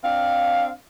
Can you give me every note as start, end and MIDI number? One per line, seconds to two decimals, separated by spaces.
0.03 0.71 60
0.03 0.71 62
0.03 0.71 77